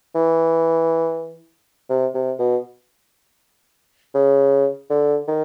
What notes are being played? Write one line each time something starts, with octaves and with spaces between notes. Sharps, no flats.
E3
C3
C3
B2
C#3
D3
D#3